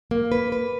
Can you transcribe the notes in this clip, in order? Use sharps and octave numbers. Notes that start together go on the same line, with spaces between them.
A#3
B4
B4